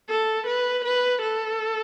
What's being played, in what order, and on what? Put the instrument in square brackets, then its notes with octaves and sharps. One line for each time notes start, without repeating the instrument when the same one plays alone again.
[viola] A4
B4
B4
A4